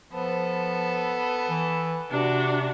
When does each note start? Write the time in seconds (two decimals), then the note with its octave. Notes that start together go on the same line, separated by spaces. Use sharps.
0.13 F3 B3 A4
1.48 E3
2.12 C3 D4 F#4